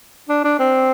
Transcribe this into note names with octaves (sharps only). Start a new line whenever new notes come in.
D4
D4
C4